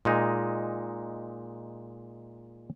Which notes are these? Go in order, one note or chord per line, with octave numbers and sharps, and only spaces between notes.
A#2 G#3 D#4